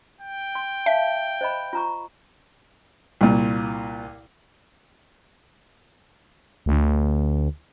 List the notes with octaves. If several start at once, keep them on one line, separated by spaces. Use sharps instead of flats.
G5
C6
E5 F5 A5
C5 D#5 B5
F4 A#5 C#6
C2 A#2
D2